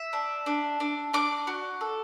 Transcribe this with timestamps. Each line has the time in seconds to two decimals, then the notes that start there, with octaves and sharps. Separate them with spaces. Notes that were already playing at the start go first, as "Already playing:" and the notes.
Already playing: E5
0.13 D4
0.46 D4
0.80 D4
1.13 D4 D6
1.47 F#4
1.81 A4